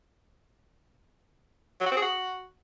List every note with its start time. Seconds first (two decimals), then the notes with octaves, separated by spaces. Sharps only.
1.81 F#3
1.86 F#4
1.92 C4
1.97 G#4
2.02 F#4